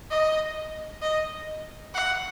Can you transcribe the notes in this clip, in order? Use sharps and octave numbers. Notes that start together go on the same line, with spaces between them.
D#5
D#5
F#5